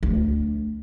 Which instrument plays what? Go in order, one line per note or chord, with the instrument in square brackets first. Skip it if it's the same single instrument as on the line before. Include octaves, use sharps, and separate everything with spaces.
[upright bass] D2